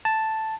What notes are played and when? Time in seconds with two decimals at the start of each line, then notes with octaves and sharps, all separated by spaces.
0.05 A5